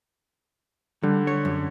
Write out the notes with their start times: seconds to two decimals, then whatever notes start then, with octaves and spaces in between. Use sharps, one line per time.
1.03 D3 G3
1.27 C#5
1.45 F#2